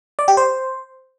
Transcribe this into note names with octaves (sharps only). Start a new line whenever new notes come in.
D5
G4
C5